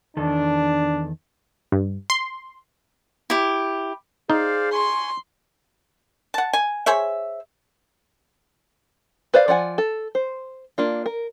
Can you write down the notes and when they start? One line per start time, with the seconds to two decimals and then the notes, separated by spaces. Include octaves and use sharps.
0.17 E2 D#3 D4 A4
1.72 G2
2.10 C6
3.30 E4 G4
4.30 D#4 G#4 C5 D5 F5
4.73 G#5 C6 C#6
6.34 F#5 A5
6.53 G#5
6.86 G#4 C5 C#5 E5
9.34 B4 C5 D5 F5
9.48 F3 D5 F#5 G#5
9.78 A4
10.15 C5
10.78 A#3 D4 F4
11.06 A#4